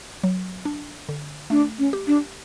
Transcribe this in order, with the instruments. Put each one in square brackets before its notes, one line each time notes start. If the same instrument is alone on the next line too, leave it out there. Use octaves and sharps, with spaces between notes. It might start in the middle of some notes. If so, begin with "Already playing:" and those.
[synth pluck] F#3
D4
D3
[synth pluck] A3 [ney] D4
[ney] C#4
[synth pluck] G4
[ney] D4